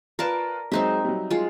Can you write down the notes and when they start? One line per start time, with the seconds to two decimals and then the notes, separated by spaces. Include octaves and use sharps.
0.19 F4 A#4 B4 D5 A5
0.72 F#3 G#3 C4 D#4 E5
1.05 F#3 G3
1.30 G#3 F4